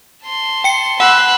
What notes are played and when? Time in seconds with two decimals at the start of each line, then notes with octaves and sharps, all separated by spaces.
0.23 A5 C6
0.64 G5 C#7
1.00 F#5 B5 E6 F#6